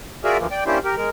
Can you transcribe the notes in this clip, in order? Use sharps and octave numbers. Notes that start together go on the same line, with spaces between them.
F4 F#4 G#4 A#4 D5 E5
D2 E3 F3 A#3
D5 G5
A#3 C#4 D4 E4 G4 C5
G4 A#4
G#3 A#4